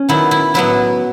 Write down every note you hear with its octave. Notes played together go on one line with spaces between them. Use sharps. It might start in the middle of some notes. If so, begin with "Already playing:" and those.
Already playing: C#4
D#3 F#3 B3 E4
E4
A2 F#3 B3 E4